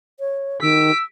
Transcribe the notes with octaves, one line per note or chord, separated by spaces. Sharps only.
C#5
D#3 E6 B6 D7